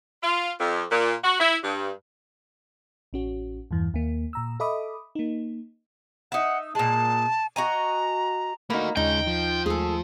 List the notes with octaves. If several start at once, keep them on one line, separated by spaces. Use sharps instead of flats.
F4
F2
A#2
F#4
E4
G2
A1 C#4 F#4
E2 G2 E3
D#2 A#3
A#2 A#5 E6
A4 D#5 E5 B5 D6 D#6
A#3 D#4
D#4 E5 F#5
A#2 G#3 A5
F#4 D#5 G#5 A#5
A3 A#3 D#4 F#4 B5 F6
D#2 C#3 G#3 D#4 G5
F3
D#2 G#3 A3 G#4 A4